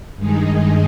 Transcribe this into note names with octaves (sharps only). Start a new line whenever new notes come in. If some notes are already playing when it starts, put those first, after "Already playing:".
G2 D#3 G#3 D#4 G#4